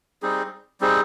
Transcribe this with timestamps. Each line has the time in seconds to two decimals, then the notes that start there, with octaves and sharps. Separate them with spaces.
0.22 G3 C4 D#4 G#4
0.81 G3 C4 D#4 G#4